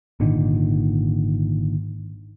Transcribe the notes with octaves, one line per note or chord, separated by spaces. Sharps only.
G#1 A#2 D3 D#3